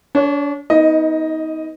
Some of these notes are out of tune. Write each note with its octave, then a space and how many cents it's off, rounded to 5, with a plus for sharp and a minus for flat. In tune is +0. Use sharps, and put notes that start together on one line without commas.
D4 -35 C#5 +0
B3 +0 D#4 +30 D#5 +0